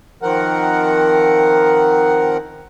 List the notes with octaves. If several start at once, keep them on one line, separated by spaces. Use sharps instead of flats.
D#3 F3 C4 A#4 F#5